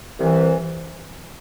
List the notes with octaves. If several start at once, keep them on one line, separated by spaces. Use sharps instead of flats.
C2 C3 E3